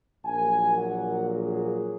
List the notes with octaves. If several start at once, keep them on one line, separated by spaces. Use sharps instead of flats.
A#1 A#2 F#3 A#3 G#5
F#5
G#4